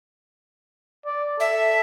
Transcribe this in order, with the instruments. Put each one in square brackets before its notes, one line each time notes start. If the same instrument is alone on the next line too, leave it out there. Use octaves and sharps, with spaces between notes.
[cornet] D5
[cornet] A4 [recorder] E5